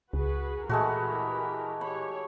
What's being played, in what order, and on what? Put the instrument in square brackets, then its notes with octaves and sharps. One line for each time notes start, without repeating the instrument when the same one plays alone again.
[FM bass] C#2 [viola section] F#4 G#4 B4
[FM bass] A#2 [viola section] E3 G4 A#4 [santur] G#3 A3 F#4 [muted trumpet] B5
[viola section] G4 C#5 [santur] B5